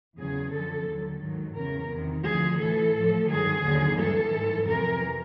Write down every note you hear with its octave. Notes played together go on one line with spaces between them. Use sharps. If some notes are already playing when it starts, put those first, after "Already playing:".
E2 C#3 F#3 G#4
F#2 D3 F3 A4
D#2 D3 F#3
G#2 D#3 F#3
E2 C#3 E3 A#4
E2 C3 D#3
D2 D3 F3 G#4
A2 E3 A4
A2 F3
G2 D#3 F#3 G#4
D#2 D3 F#3
G2 E3 A4
G#2 E3
F2 C3 E3 A#4